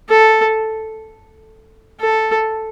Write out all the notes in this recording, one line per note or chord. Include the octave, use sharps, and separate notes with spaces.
A4
A4